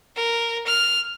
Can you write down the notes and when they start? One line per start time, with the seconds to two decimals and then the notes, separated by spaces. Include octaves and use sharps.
0.16 A#4
0.66 F6